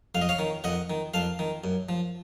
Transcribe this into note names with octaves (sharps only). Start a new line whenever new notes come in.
F2 F5
D#5
C#5 F5
D#3
F2 D#5 F#5
D#3
F2 F5 A5
D#3
F#2
F3